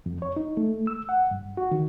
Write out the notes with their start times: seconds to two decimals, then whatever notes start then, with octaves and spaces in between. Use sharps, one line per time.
0.06 F2
0.22 C#5
0.36 D#4
0.57 A3
0.87 E6
1.09 F#5
1.31 G2
1.57 F#4
1.71 D#3